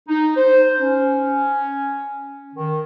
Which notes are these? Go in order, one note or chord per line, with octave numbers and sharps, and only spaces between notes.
D#4
C5
C#4
D#3